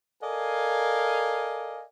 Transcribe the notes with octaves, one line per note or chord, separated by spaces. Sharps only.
A4 A#4 D5 D#5 F5 G#5